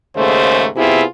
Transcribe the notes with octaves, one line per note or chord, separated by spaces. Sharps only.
D#2 G#2 C#3 A3 C5
C3 B3 E4 F4 G#4